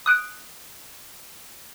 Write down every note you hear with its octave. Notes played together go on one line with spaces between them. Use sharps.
D#6 F#6 D7